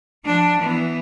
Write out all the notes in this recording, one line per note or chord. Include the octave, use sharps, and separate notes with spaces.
F3 D4
E3 B3